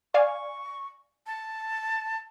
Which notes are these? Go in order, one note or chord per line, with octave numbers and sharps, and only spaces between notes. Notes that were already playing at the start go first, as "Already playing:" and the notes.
D5 F5 G#5 C#6
A5